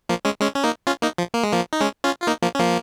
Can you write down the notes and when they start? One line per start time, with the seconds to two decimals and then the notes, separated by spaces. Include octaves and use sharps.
0.09 F3 A#3
0.25 G#3 C#4
0.40 G#3 C#4
0.55 C#4
0.64 A#3 D#4
0.87 C#4 F4
1.02 A#3 D#4
1.18 F3
1.34 A#3
1.43 G#3
1.52 F3 A#3
1.73 D#4
1.81 G#3 C#4
2.04 C#4 F4
2.22 F4
2.27 A#3 D#4
2.42 F3 A#3
2.55 C#4
2.59 F3 A#3